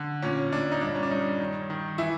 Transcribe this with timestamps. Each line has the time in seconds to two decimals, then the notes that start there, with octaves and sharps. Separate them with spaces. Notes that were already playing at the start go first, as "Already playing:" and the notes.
Already playing: D3
0.22 A#2 C#4
0.53 A#2 D4
0.72 D#4
0.81 G2 D4
0.95 C#4
1.03 D4
1.11 G2 D#4
1.40 D#3
1.70 D#3
1.98 E3 E4